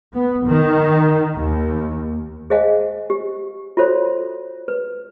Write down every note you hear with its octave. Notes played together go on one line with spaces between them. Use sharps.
B3
D#3
D#2
G#4 C5 D#5 F5 F#5 G#5
G4
F4 F#4 A4 C5 C#5
B4